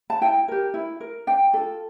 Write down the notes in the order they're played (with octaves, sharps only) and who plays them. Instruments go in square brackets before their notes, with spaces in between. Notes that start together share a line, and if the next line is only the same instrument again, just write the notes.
[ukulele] A5
E4 G5
G4 A#4
E4
A#4
D4 G5
F4 A4